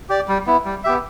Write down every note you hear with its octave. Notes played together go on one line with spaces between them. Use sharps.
G4 D5
G3
B3 E4
G3
B3 G4 E5